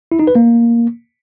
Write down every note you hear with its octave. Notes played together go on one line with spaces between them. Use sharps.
E4
D#4
B4
A#3